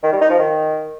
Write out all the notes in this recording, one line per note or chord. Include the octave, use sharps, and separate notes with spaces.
D#3
G3
D#4
F3
D#3